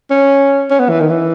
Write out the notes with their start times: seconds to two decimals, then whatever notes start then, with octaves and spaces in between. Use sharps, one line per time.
0.10 C#4
0.70 C#4
0.80 B3
0.89 E3
1.00 D#3
1.09 E3